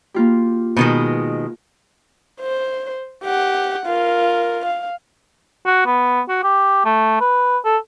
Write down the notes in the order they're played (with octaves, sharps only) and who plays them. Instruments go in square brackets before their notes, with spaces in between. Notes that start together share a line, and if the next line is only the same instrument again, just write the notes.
[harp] A#3 F4 G4
[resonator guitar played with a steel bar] B2 D#3 G#3
[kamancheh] C5
G4 F#5
F4 A#4
F5
[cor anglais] F#4
B3
F#4
G4
A3
B4
A4